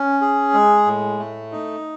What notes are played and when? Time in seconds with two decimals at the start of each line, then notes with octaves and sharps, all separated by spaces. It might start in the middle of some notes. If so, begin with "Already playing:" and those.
Already playing: C#4
0.21 G#4
0.54 G#3
0.86 A2
1.19 A3
1.52 D#4